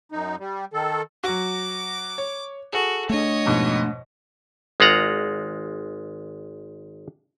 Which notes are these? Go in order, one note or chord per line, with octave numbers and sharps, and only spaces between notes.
F#2 D#4
G3
D#3 A4
F#3 F#4 D6
C#5
F#4 G#4 A4
A3 D4 C#5 D#5
F2 G#2 B2
G#1 G#3 F4 F#5 A#5